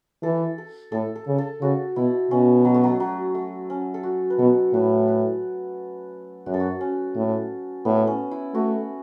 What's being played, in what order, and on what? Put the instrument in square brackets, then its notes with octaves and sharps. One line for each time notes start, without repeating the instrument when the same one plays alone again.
[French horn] E3 [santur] A4
[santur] A4
[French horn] A2 [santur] A4
[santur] A4
[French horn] C#3
[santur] A4
[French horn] C#3 [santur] F#4
[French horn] B2 [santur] E4
[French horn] B2 [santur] C#4
[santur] F#3
A3
F#3
F#3
A3
C#4
A4
F#4
B4
[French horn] B2 [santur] A4
[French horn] A2 [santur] B4
[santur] B4
[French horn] F#2 [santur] F#4
[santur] A4
F#4
C#4
[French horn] A2
[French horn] A2 [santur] B3
[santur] C#4
E4
[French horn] A3 [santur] F#4